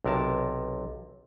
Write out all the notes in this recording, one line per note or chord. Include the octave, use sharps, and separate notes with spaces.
B1 C3 A#4 A5